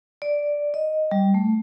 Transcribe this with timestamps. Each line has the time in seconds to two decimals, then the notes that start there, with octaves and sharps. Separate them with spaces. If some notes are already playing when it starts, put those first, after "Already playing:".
0.22 D5
0.74 D#5
1.11 G3
1.34 A3